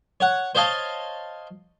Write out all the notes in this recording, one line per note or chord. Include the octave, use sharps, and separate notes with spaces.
C#5 F#5
C5 C#5 D#5 F5 A5